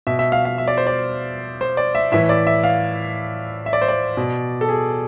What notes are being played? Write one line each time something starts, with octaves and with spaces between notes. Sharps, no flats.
B2 E5
E5
F5
F5
E5
D5
C5
D5
C5
D5
E5
A2 E3 E5
D5
E5
F5
E5
D5
C5
D5
B2
A4
G#4